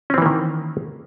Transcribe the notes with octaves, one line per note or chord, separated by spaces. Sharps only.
D#3 E3 A#3 C4 C#4